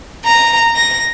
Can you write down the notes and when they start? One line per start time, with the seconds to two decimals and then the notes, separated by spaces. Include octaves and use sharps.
0.25 A#5
0.76 A#6